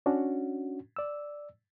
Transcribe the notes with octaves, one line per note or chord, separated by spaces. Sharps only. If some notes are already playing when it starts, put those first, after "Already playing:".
C#4 D4 F#4
D5 E6